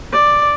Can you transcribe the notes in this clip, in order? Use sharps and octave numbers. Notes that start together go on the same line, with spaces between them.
D5